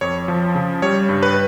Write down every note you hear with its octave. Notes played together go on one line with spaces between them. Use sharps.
F2 C#5
F3
C#3
G3 C#5
G2
B4